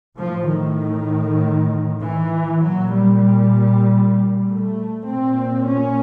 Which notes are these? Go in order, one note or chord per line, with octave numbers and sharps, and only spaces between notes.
A2 F3
D#3
E3
A#2 F#3
G3
A3
A#2 C4
C#4